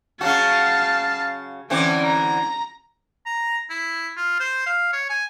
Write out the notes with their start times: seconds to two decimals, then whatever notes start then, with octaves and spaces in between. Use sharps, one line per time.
0.21 C#3 F#3 F#4 F5 A5
1.70 D3 E3 C4 C#4
2.04 A#5
3.26 A#5
3.70 E4
4.16 F4
4.40 C5
4.66 F5
4.93 C#5
5.09 G#5